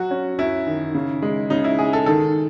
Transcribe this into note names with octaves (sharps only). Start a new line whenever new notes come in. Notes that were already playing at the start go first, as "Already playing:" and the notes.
Already playing: F#3 F#4
C#4
F#2 E4
D#3
C#3
G#3
C#3 D#4
E4
G#3 G#4
A4
D#3 A4